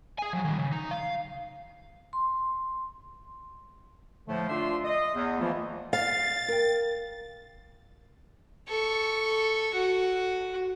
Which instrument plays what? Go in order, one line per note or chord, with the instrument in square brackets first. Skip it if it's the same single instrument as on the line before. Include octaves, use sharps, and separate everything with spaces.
[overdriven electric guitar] G#4 G#5
F3 F#3
D#3 G3
C#3
D#4
F5
[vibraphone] C6
[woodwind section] A2 D3 F3 A3
D4 F4 E5 C6
D#5
E2
E3 F3 A3 A#3 F4
[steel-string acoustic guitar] F5 [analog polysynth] A6
[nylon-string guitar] A#4 G5
[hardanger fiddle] A4 C#6
F#4